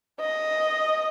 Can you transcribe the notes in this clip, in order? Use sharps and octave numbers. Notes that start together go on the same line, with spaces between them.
D#5